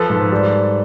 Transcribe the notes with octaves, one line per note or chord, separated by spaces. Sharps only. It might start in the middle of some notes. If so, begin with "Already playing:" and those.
Already playing: F3 A4 B4
G#2
G3